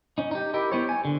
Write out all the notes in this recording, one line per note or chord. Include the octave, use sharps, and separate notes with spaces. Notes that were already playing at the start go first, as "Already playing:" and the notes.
C#4 D#4
D#4 G4
E4 G4 A#4
B3 E4 G4 C5 C#5
G#5
D3